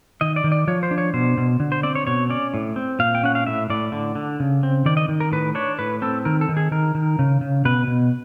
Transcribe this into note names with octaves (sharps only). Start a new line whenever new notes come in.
D#3 D#5
D5
D#3
D5
F3 C#5
C5
D4
C#5
B2 C5
B2
D3
C5
C4 D5
C#5
B2 C#5
C#4 D5
A2
C4
A#2 F5
G5
C#4 F#5
F5
A2 E5
A2 D5
D3
D3
C#3
C4
D#3 D5
D#5
D#3
A#4
A2 B4
D4 C#5
A2 B4
C4 A4
D#3 A#4
A4
D#3
G#4
D#3 A#4
D#3
C#3
C#3
B2 B4
B2